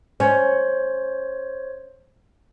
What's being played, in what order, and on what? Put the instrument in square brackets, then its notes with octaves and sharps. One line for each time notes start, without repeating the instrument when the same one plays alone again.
[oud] C#4 [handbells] C5 C#5